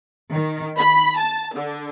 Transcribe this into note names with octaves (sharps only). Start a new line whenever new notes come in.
D#3
B5
A5
D3